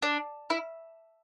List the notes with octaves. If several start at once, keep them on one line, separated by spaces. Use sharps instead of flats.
D4
E4